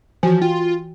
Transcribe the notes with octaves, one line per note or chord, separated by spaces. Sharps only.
E3 F3 F#4 G#5
F4 G5